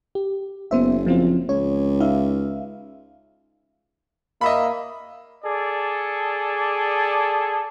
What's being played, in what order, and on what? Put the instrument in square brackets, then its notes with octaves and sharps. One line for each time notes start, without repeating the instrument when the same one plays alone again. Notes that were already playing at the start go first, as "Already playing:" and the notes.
[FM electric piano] G4
[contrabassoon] F#1 [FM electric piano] B3 C5 E5
[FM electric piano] F3 C4 F4
[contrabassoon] C#2 [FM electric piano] C#5
[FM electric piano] D#4 E5 F5
[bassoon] A#3 [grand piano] D#5 E5 B5
[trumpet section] G#4 A4 D5